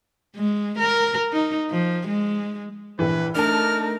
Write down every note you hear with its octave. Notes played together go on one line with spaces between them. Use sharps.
G#3
A#4
D#4
F3
G#3
A#1 E3 B4
A3 D4 D#4 A#4 A5 F6